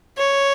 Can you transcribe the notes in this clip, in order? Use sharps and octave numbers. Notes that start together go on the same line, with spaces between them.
C#5